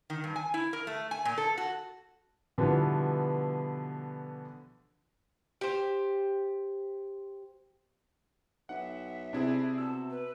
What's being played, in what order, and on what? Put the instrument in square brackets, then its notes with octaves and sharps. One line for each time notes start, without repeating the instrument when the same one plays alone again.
[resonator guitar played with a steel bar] D#3
G2
G#5
E4
A#4
A3
G#5
A#2
A4
F#4
[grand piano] B2 D3 E3 F3 G3 B3
[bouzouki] G4 C5
[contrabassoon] B1 [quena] E5 [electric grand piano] F#5
[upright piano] C3 [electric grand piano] D4 E4 G#4
[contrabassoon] B2 [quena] A5 [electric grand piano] E6
[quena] B4